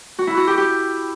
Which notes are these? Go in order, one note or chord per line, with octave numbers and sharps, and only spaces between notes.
F#4
E4
F#4
G4
G4